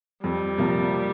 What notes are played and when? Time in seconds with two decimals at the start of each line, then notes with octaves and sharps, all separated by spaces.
0.23 F2 G3
0.58 C3 F3 A#3